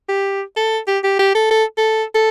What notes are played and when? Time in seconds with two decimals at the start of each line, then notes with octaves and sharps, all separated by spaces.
0.09 G4
0.56 A4
0.87 G4
1.04 G4
1.19 G4
1.35 A4
1.50 A4
1.78 A4
2.14 A4